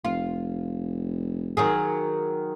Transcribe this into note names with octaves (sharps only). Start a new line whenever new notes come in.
F1 F4
D#3 F#3 G#4